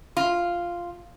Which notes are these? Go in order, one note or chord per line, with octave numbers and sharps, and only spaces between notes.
F4